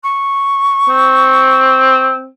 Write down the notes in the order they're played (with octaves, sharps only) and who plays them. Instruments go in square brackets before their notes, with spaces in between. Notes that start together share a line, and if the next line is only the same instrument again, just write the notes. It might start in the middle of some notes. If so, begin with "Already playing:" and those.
[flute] C#6
[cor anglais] C4